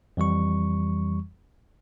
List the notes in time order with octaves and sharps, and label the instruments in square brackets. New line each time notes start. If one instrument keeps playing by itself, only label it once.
[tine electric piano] F2 E3 G3 C#6